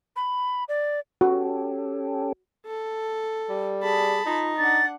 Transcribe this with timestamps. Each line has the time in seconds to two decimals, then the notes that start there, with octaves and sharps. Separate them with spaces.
0.16 B5
0.68 D5
1.21 C#4 F#4 G4 A4
2.66 A4
3.49 G3
3.83 G#4 A5 B5
4.26 D#4 F4
4.57 D4 F#5 A6